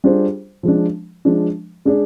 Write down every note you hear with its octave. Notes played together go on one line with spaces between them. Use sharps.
G3 D4 F4 G#4 C5
F3 G#3 D4
F3 G#3 D4
G#3 D4 G#4 D5